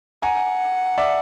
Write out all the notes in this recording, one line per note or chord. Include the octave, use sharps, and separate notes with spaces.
F#5 G#5 A#5
D5 E5